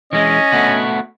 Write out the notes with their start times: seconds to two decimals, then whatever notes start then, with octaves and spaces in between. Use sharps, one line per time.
0.13 E3 G#3 C#4 D#5
0.52 A3 B3 F#4